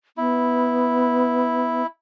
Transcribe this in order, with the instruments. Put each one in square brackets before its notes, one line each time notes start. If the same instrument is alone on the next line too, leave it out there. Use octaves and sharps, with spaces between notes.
[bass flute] B3 [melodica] E4